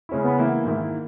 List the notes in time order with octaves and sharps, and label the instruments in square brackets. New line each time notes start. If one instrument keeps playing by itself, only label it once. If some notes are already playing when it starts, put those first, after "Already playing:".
[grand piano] C#3 G#3 C#4 E4
[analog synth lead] B3
[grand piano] E3 A#3 E4
G#2 D#3 A#3 E4